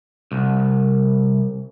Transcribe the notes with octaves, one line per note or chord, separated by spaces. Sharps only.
C2